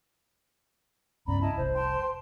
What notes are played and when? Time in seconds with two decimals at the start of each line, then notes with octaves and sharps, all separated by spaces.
1.28 C#2 G2 B3 C#4 D5 A#5 B5
1.41 E4 D#5 A5
1.57 F1 C2 C5
1.74 G5 A5 C6